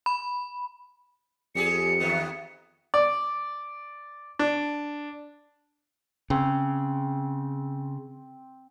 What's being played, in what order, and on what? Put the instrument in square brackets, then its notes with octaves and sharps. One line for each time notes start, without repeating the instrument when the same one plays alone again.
[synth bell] B5
[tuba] F2 [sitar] G3 G4 G#4 [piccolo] C#7
[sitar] D#2 D#3 B3
[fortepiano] D5
D4
[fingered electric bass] C#3 [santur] C4